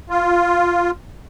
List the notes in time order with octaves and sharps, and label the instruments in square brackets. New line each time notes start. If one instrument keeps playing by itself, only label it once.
[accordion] F4